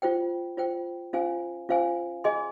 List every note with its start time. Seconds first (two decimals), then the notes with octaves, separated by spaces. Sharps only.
0.02 F4 C5 G5
0.57 F4 C5 G5
1.13 C#4 F4 C5 F5 G#5
1.69 C#4 F4 C5 F5 G#5
2.24 G#4 D#5 G#5 C6